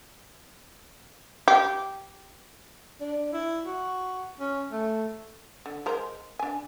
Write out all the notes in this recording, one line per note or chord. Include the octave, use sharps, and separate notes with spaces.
G4
D4
E4
F#4
C#4
A3
D3
G#3 A#4 C5
D4 G#5